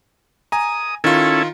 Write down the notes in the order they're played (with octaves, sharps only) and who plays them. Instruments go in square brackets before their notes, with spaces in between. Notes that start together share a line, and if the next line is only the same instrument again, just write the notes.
[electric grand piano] G#5 A#5 [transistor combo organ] D#6
[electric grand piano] D#3 F4 [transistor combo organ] C#4 E4 A4